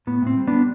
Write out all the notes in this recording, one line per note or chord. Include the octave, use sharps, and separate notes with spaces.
A2 B3
A2 C4
G3
G3 B3 D4